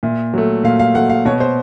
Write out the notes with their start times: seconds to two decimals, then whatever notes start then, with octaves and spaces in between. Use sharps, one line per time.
0.03 A#2 E5
0.34 F#3 A3
0.64 A#2 F5
0.79 F5
0.94 F#3 A3 F#5
1.10 F5
1.25 B2 C#5
1.40 C5